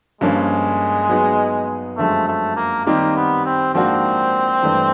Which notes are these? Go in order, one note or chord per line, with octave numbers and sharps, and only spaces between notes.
G2 D3 F3 G#3 A#3 C#4
F#3 B3 D#4 G#4
F#2 D3 F3 G#3 A3
A3
A#3
D#3 G3 A#3 C4 D#4 G4
B3
C4
G#2 F3 A#3 C4 D4 F#4
G2 E3 A3 D4